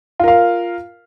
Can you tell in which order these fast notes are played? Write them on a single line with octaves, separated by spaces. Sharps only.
F4 A#4 F5